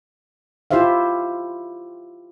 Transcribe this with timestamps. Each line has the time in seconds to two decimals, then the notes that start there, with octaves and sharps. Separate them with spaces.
0.71 E4 F4 G4 C5 E5 F5